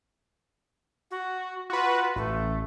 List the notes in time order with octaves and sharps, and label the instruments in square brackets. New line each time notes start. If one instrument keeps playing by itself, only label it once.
[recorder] F#4
[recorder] F4 [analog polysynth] F#4 B4
[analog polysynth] A1 [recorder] A3